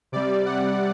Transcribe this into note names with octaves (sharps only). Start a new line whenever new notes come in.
C3 G3 D5
F#5